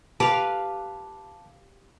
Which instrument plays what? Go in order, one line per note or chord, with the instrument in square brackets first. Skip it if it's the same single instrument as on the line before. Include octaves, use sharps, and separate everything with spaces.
[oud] G4 [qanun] B4 F5 [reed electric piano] A5